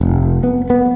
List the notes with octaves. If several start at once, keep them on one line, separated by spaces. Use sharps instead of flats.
F1
B3
B3